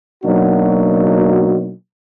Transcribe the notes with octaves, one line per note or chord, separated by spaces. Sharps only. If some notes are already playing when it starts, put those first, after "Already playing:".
B2 F#3 A#3 D4 D#4 F#4